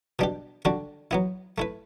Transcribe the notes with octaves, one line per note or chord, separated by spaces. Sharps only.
B2 G3 D4 G4
D3 G3 D4 F#4
F#3 B3 E4
A3 E4 B4